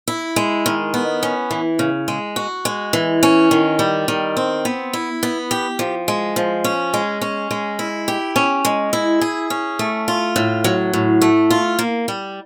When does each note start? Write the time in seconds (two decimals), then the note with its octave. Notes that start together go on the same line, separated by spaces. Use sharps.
0.08 E4
0.36 G#3
0.66 D#3
0.94 B3
1.23 C#4
1.51 E3
1.79 C#3
2.08 G#3
2.36 F#4
2.65 G#3
2.93 E3
3.23 C#4
3.51 D#3
3.79 G3
4.08 D#3
4.37 C4
4.65 B3
4.93 E4
5.23 B3
5.51 G4
5.79 F3
6.08 G#3
6.36 F3
6.64 C#4
6.94 G#3
7.21 C#4
7.51 G#3
7.79 E4
8.08 G4
8.36 C#4
8.65 G#3
8.93 E4
9.21 G#4
9.50 C#4
9.79 A3
10.08 F4
10.36 A2
10.64 F#3
10.93 A2
11.22 A3
11.50 F4
11.79 A#3
12.08 G3